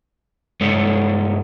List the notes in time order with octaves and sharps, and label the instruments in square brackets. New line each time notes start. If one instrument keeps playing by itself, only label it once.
[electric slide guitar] G2 G#3 A4 C#5